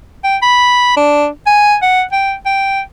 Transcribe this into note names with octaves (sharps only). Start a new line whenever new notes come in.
G5
B5
D4
G#5
F#5
G5
G5